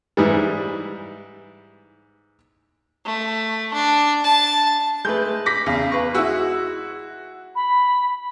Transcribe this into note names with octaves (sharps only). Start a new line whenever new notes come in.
G#2 E3 G3
A3
D4
A5
G#3 A3 B4 G6
D6 A#6 B6
E2 C#3 F5
B4 C#6
G#3 E4 F#4 E6
B5